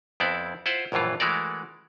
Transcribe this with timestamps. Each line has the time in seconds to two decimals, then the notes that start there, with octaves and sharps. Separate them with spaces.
0.20 F2 B3 C4 E4 D5
0.66 E4 F4 C5 F#5
0.92 A#1 F#2 A2 E3 F4
1.20 E3 G#3 A3 F#4 A#4 D5